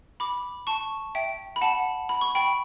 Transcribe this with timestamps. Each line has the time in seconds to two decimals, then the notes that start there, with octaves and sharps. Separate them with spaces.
0.20 B5 D6
0.67 A5 C#6
1.15 E5 G5
1.56 B5
1.61 F#5 A5
2.09 B5
2.21 C#6
2.35 G5 B5